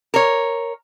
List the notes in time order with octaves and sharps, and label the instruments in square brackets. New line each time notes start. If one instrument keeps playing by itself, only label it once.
[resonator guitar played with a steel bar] A#4 C#5